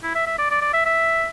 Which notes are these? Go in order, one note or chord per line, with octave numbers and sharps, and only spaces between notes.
E4
E5
E5
D5
D5
D5
E5
E5